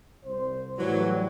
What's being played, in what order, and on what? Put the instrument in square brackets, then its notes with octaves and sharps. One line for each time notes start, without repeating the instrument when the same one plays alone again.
[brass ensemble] C2 C5
[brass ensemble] A2 G3 [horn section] E3 F#3